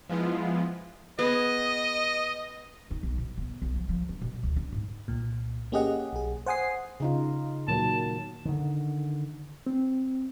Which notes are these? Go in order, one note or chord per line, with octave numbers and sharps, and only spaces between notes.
F3 G#3 B3 E4 F4
B3 G#4 B4 D#5
D#4
B1
B2
B3
B1
F3
F3
D4
B2
D2
D4
G#2
C2 A#2
A#3 C#4 G4 G#4 D#5 F#5
B1 G#4
C5 F#5 G#5 D#6 C7
C#3 D#4 F4
A#2 D#3 F#3 A5
D3 D#3
C4